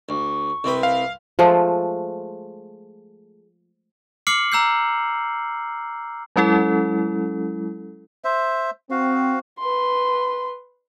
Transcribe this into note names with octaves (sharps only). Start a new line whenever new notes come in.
D2 C#6
C2 C4 B4
F5
F3 G#3 A3
D6 F6 C7 C#7 F#7
A#5 E6 G6 C7
F#3 G#3 C#4 E4 A4
C5 E5
C4 F#4 F5
B4 C6